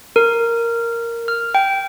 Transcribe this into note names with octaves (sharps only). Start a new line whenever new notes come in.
A#4
F6
G5